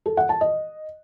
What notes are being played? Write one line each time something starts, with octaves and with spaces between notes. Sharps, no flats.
A4
F#5
A5
D#5